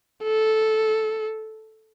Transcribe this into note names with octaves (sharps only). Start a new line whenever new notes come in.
A4